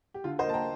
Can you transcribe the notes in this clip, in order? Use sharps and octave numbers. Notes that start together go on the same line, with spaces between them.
G4
D3 F4
C5 D#5
A#3
A5
G5 A#5